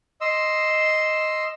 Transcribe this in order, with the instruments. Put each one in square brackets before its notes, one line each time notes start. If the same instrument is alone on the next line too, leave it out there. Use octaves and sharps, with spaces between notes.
[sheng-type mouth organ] D#5 C6 E6